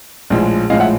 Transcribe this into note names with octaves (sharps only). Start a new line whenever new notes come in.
A#1 A2 F3 G#3
A#1 A2 F3 G#3 D#5 F5
E5 F#5